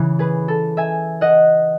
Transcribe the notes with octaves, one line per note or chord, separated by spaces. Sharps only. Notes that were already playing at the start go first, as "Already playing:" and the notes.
Already playing: C#3 E3
G#4 B4
A4
E5 G#5
D#5 F#5